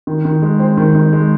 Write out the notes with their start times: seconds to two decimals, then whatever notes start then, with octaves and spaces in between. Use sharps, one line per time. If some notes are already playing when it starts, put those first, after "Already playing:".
0.07 D#3
0.25 D#3
0.42 G#3
0.59 C4
0.78 D#3
0.95 D#3
1.13 G#3